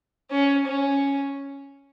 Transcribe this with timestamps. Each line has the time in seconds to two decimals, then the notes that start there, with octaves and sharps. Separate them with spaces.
0.30 C#4
0.66 C#4